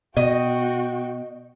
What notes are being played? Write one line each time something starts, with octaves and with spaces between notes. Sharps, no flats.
B2 F#4 D#5 G5